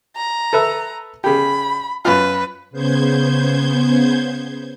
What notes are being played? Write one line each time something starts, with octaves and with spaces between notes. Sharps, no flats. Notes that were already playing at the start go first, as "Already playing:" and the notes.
A#5
A4 B4 E5
C#3 G4 B5
F#2 F4 B4
C#3 B3 C5 G6 G#6